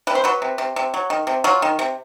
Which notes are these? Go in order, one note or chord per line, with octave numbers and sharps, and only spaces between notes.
C3 B4
C5
F#3 B4
C3
C3
C3
F#3
D#3
C3
F#3 F4
D#3
C3